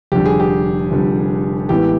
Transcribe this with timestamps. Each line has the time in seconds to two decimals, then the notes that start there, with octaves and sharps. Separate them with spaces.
0.12 F1 F2 D3 G3 G4
0.26 G#4
0.40 G4
0.91 F1 F2 D3 G3
1.69 A1 A2 E3 G#3 B3 G4